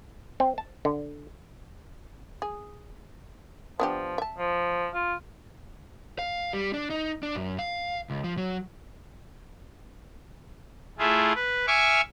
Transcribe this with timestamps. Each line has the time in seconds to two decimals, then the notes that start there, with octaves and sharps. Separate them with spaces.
0.40 C4
0.58 A5
0.85 D3
2.42 G#4
3.80 F3 B3 D4 G4
4.18 E5 A5
4.39 F3
4.94 F4
6.19 F5
6.53 G3
6.74 D4
6.90 D#4
7.23 D4
7.35 F#2
7.59 F5
8.10 C#2
8.24 F3
8.38 F#3
10.99 A3 E4 F4 G#4
11.36 B4
11.67 E5 G#5 C#6 D6 F6